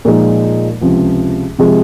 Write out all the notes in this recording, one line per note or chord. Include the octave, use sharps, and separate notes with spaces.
A#2 F3 G#3 D#4
C#2 C3 F3
C3 F3 G#3